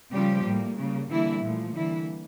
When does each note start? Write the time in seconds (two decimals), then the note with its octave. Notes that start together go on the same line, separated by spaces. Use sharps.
0.12 C#3 F3 G3 A3 G4
0.45 A2 G3 A#3
0.77 C#3 G3 A#3
1.10 D3 E3 G3 A#3 E4
1.43 A#2 F3 A3
1.75 D3 E3 G3 A#3 E4